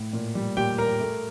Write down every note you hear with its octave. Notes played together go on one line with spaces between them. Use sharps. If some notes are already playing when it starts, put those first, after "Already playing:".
Already playing: A2
A#2
G3
A#2 G4 G5
A#3 A#4 A#5
A3